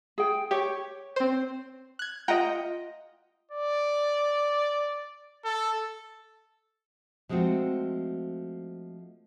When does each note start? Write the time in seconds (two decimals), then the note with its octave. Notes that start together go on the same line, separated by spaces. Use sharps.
0.18 G#4 G5
0.51 G4 C#5
1.16 C4 C5
1.99 F#6 G#6
2.28 F4 D#5 F#5 G5 A#5
3.51 D5
5.45 A4
7.29 F3 G#3 A3 C4 F#4